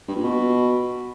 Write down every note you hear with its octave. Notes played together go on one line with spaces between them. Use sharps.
G2
A#2
B2